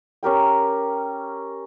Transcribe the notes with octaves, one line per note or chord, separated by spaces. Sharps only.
C#4 G4 A#4 G5